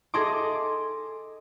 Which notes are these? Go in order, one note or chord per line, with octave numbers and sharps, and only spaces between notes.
G#4 A4 D#5 C6 D6